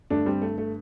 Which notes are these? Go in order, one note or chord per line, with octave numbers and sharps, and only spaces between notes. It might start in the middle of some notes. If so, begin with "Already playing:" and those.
G2 D3 A3 D4
G3 C4
A3
A3